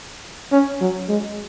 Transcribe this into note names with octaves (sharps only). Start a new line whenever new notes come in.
C#4
F#3
G#3